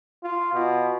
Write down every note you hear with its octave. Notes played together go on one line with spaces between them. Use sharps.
F4
B2